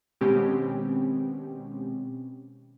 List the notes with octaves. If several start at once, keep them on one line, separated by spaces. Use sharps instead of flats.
B2 D#3 G#3 C4 C#4 G4